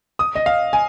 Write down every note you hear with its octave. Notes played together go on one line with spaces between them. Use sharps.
D#6
D#5
F5
G#5